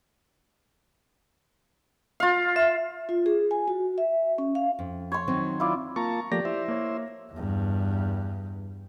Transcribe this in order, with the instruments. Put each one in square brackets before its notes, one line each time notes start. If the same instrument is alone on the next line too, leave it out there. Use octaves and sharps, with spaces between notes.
[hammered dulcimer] F4 F5
[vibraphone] E5
F4
G#4
G#5
F#4
E5
C#4
F5
[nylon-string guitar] F2
[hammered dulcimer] C#5 C6
[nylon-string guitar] D#3 F#3 C4
[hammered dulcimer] E4 F4 D5
[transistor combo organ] A#3 F4 A5 [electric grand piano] A#5 C#6
[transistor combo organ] F3 A3 A#3 [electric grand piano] G4 D5 A#6
[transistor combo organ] E4 C5 E5
[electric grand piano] A#3 C#5
[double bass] E2 G2